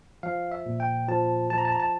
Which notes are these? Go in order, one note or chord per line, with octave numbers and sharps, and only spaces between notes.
F3 F5
E5
A#2
G5
F3 A5
F3 A5
A#5
A5
A#5
A5